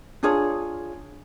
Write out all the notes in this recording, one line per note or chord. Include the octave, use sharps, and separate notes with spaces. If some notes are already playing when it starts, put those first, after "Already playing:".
D4 F4 G#4 C#5